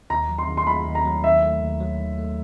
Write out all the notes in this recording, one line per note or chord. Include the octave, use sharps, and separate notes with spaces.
D#2 A#5
F#3
C6
D#3
C6
A3 B5
D#2
A#5
F#3
D#3 E5
A3
D#2
F#3
D#3
A3